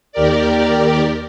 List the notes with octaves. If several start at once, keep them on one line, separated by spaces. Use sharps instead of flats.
D#2 G4 A#4 D5